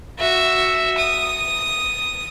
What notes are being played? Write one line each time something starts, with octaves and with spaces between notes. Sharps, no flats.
F#4 E5
D#6